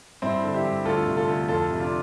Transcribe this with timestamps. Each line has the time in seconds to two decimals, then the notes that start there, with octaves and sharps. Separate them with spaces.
0.22 G2 C4 E4
0.43 D3
0.54 E4 G4
0.64 G2
0.85 D2 F4 A4
1.06 C3
1.17 F4 A4
1.28 D2
1.48 F2 F4 A4
1.70 C3
1.80 D4 F4